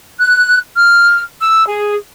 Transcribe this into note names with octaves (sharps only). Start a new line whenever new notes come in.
F#6
F6
E6
G#4